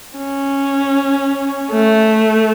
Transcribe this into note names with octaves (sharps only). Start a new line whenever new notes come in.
C#4
A3